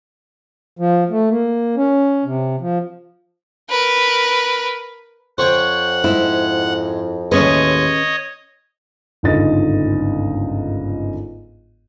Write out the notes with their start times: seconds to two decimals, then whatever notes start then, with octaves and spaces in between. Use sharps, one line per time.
0.79 F3
1.10 A3
1.29 A#3
1.77 C#4
2.25 C3
2.60 F3
3.70 A#4 B4
5.38 F2 C5 C#5 F#5 G5
6.04 G#2 E4
7.32 D#2 A2 G#3 C#4 B4 C#5 D#5
9.23 G1 C#2 G#2 D3 D#5 A6